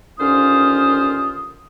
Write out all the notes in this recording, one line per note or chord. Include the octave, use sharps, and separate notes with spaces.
D#2 D3 C#4 F4 C5 D#6